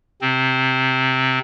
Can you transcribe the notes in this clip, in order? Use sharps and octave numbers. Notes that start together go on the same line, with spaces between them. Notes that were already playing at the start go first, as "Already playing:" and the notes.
C3 C4